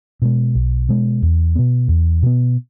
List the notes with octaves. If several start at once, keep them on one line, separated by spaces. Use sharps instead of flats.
B2 G#3
B1
B2 G#3
E2
B2 B3
E2
B2 B3